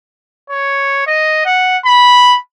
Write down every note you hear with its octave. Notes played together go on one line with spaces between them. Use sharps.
C#5
D#5
F#5
B5